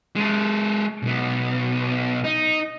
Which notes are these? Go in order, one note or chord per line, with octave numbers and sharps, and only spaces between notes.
G#3 A4
B1 B3
D#4